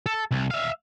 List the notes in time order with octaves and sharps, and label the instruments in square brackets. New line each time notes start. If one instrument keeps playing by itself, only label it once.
[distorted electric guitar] A4
C2
E5 F5